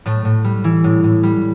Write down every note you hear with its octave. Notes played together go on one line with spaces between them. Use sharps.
A2 A3
A2
G3
E3
A2
A2
G3